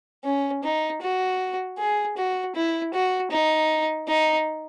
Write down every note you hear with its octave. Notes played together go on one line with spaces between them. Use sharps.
C#4
D#4
F#4
G#4
F#4
E4
F#4
D#4
D#4